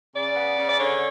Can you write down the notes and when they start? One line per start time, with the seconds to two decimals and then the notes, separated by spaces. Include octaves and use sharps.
0.14 C#3 D5
0.36 B3
0.58 C#3
0.69 D5
0.80 D3 C#5